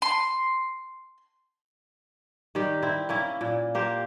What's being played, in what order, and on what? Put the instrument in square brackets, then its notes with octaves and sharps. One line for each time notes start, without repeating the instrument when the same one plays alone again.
[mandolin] C6
[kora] D#3 G3 G4
C4 E4
A#3 C#4 E4
A#2
A#3 G4 C5